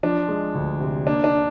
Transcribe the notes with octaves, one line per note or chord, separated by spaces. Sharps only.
F3 D4
G#3
D2
C3
A#3 D4
D4